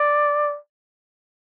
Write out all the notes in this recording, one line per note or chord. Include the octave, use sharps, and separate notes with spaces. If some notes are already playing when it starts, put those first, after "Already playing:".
Already playing: D5